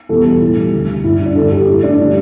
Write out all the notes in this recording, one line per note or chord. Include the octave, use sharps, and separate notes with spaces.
E2 B2 G3 A4
A2 G3
D2 D3 G3
G2 G3 E4
D4
D4
G2 D3 G3 A4
G4
A2 A3 E4
D4
D3 G3